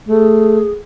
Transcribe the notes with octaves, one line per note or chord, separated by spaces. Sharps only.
A3 G#4